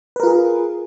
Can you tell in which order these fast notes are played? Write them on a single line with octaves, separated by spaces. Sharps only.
B4 A#4 F4 G#4